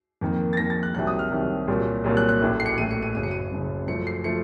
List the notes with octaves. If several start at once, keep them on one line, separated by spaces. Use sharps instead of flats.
F2 D#3 A#3
A6
F2 D#3 A#3 A#6
A6
F#6
C2 C3 D#3 F#3 F#6
D#6
F6
C2 C3 D#3 F#3
C2 A#2 F#3 A#3
C2 A#2 F#3 A#3
F#6
F#6
A1 A2 A3
C7
C#7
A1 A2 A3 D#7
C#7
D#7
F#1 F#2 C#3 D#7
C#7
D#7
F#1 F#2 C#3
F#2 F3 A3 C#7
C7
F3 A3 C#7